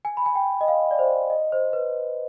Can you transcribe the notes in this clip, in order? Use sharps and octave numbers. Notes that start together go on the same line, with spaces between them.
G#5
B5
G#5
G5
D#5
F5
D5
C5
D#5
C5
B4